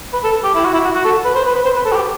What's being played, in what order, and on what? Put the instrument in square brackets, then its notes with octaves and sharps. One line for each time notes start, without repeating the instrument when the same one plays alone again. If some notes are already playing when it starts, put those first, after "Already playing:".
[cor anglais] B4
A4
G4
E4
F#4
E4
F#4
F#4
A4
B4
C5
B4
B4
C5
B4
A4
F#4
G4